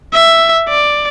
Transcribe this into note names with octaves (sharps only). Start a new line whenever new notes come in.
E5
D5